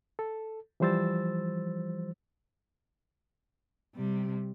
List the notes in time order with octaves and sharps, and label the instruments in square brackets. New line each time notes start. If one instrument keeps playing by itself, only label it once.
[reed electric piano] A4
E3 F3 G3 C5 E6 A6
[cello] C3 G3